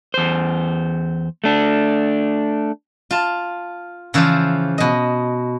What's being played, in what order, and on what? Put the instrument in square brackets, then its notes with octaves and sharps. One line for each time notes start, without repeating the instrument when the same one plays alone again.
[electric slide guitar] E2 C5
A3 D4
[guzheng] F4 A5
C#3 E3 F3 C5 D5
B2 D#5